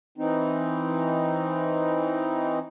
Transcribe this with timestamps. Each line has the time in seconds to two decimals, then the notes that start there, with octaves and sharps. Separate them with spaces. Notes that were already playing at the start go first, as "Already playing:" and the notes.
0.18 E3 C4 D#4